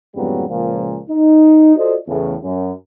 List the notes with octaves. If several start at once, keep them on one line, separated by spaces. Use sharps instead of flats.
F2 G#2 C#3 F#3 G3 B3
C#2 A#2 F3
D#4
F4 F#4 A4 C5 D5 D#5
E2 A2 C#3
F#2